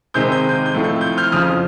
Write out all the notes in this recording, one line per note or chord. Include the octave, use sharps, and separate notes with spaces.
C3 D#3 G#3 C4 G6
G6
G6
G6
A2 F3 A3 C4
G6
G6
F6 G6
F2 C#3 F3 D#6 F6